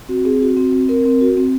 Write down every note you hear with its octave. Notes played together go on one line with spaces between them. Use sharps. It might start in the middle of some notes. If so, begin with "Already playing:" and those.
C4 F#4
C4 G#4
F#4
C4
C4
C4 A#4
C4
F#4
C4